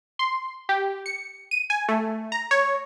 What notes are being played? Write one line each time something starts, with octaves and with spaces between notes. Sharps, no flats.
C6
G4
C#7
D#7
G#5
A3
A#5
C#5